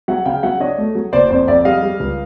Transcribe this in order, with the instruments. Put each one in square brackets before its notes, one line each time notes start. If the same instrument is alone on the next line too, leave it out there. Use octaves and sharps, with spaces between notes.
[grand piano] F#3 [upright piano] E5 F#5
[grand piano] C#3 [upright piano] F5 G5
[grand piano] F#3 [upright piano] E5 F#5
[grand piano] D4 [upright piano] C#5 D#5
[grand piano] A3
F#3
[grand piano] F#1 [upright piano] C5 D5
[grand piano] F2 [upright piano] C5 D5
[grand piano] F2 [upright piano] D5 E5
[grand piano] G3 [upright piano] D#5 F5
[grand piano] G3
C#2